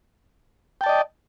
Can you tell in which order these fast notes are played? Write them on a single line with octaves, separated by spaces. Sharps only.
G5 A5 D5 D#5